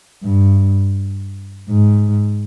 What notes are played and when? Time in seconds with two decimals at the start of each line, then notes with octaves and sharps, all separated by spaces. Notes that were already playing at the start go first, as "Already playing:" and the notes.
0.23 G2
1.70 G#2